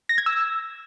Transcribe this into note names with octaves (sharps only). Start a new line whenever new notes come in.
A#6
G#6
E6